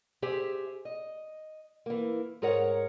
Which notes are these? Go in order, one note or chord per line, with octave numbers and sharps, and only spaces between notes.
G4 G#4 C5 E5
D#5
E3 A#3
G#2 G#4 A#4 C#5 F#5